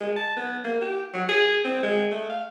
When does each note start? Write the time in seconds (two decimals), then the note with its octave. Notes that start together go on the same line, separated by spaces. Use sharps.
0.01 G#3
0.16 A5
0.36 B3
0.64 A#3
0.81 G4
1.14 F#3
1.29 G#4
1.65 C4
1.83 G#3
2.11 A3
2.30 F5